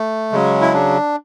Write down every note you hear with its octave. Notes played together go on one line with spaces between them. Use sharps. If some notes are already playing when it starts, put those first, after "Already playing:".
Already playing: A3
C#3 F#3 G#3
E4
D4